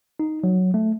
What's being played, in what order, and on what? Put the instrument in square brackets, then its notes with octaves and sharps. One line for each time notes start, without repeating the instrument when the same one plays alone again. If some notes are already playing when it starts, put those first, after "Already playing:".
[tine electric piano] D#4
F#3
A3